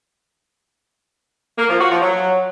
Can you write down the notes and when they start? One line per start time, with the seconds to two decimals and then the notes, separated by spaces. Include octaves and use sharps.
1.58 A#3
1.69 F3
1.80 F#4
1.91 F3
2.02 F#3